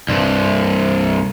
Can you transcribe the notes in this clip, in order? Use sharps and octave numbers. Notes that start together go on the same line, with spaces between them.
C2 G2